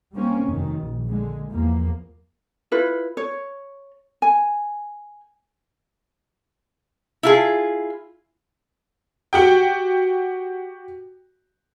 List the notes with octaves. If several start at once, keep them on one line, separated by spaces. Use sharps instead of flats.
G3 A#3 C4 C#4
F1 F#2 D#3
A#1
D3 G#3
E2 F3 A#3
E4 F4 B4
C#5
G#5
E4 F4 G#4
F#4 G4 G5